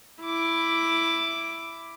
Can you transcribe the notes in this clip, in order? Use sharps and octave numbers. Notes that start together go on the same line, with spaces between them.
E4 D6